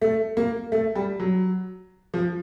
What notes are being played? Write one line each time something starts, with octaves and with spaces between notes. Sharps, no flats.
A3
A#3
A3
G3
F#3
F3